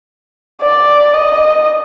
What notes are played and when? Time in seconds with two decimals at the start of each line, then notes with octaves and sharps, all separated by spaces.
0.61 D5
1.14 D#5